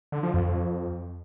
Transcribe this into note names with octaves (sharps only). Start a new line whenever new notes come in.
D3
F3
F2